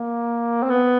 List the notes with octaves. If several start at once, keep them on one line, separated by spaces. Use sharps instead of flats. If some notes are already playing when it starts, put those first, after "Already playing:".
Already playing: A#3
C4
B3